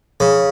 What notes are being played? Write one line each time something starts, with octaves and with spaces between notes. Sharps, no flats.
C#3